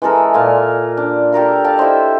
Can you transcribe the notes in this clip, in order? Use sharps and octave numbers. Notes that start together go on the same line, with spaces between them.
E3 G#3 A4 A#4
A#2 F4 F5 G#5
D4
G4 A4 A#4 F5
D5 F5 A5
E4 G4 C5 D#5